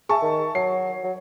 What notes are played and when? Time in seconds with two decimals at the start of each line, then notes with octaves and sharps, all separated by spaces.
0.09 G#4 E5 A5 C#6
0.22 D#3
0.55 F#3 C7
1.04 F#3